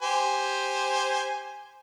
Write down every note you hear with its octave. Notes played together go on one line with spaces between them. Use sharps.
G4 C5 G#5